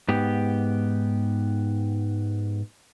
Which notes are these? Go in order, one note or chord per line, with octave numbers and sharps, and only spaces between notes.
G#2 B3 G4